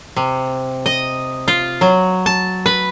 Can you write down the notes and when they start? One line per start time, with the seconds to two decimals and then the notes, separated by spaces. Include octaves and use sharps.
0.16 C3
0.86 D#5
1.48 F4
1.81 F#3
2.26 A5
2.66 B4